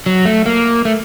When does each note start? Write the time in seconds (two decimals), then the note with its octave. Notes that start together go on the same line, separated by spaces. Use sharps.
0.06 F#3
0.25 A3
0.46 A#3
0.85 A3